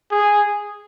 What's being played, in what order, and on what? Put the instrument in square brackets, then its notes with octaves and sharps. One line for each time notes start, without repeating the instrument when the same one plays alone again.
[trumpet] G#4